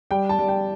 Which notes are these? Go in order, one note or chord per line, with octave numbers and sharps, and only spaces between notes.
G3 G5
A5
G3
G5